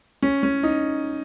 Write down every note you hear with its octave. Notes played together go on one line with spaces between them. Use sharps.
C#4
C#4
D#4